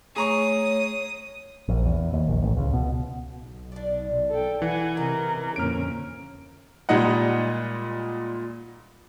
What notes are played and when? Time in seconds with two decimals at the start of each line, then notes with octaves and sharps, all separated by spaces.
0.16 A3 G#4 C#5 A#5 C#6 D#6
1.68 A#1
1.86 E2
2.13 D#2
2.28 A#1
2.42 A1
2.57 C#2
2.73 B2
3.32 B1 B2
3.72 D4 D5
4.30 A4 G5
4.62 E3 F#5 G#5
4.97 C3 D#4 A#4
5.56 F2 A#2 D3 A#3 C#4 F6 D7
6.89 A#2 G3 G#3 D#4 D#5 F#5